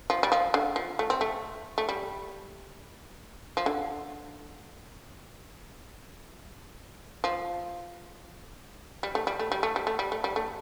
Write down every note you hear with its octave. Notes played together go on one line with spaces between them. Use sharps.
F3
G3
F3
D3
F3
A3
C4
A3
A3
G3
F3
D3
F3
G3
A3
G3
A3
G3
A3
G3
A3
G3
A3
G3
A3